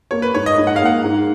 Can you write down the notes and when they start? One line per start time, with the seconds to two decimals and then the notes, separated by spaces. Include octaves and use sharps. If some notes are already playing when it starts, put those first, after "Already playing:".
0.11 A#3 C#5
0.22 B4
0.34 G#2 C#5
0.46 D#5
0.58 G#2
0.67 F#5
0.76 F5
0.82 A#3 F#5
1.04 G#2